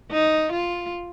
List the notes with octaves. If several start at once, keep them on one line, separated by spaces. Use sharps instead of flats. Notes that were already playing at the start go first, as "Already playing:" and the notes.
D#4
F4